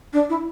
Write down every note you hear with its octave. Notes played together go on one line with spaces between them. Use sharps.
D4
E4